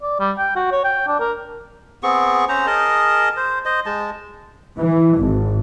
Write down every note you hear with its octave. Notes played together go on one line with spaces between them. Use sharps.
D5
G3
G5
F#4
C#5
G5
D4
A#4
B3 C4 G#4 C#6
C#4 C5 A#5
G#4 A#4 D#5 A5
C5
C5 D#5
G#3 A5
E3
G#1